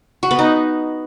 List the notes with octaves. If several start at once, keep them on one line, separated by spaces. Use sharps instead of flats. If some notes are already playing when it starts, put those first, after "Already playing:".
F#4
B3
D#4